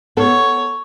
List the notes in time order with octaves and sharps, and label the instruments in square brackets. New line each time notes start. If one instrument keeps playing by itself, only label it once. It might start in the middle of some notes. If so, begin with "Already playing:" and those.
[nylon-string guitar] B3 A4 [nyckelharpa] C#5